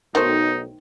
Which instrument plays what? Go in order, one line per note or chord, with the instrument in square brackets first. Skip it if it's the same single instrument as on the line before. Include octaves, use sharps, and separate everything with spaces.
[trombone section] B1 [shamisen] D#3 A3 C5 [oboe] D#4